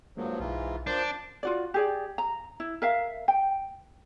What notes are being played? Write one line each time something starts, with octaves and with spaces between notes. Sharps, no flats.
G2 F3 F#3 G#3 A#3
B1 G#2 E3 F4
F3 D4 A#4 C5 G6
F4 F#4 D5
G4 G#4 D5
A#5
E4
A#4 E5 F5
G5